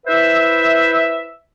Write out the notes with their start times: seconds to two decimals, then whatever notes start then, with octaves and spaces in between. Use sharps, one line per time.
0.07 E4 B4 C5 E5